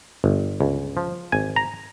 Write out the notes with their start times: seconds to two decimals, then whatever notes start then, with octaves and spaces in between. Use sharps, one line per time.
0.24 G1
0.61 C#2
0.97 F3
1.32 G#1 G#5
1.56 A#5